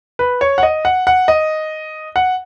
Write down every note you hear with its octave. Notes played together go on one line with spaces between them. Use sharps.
B4
C#5
F#5
D#5
F#5
F#5
D#5
F#5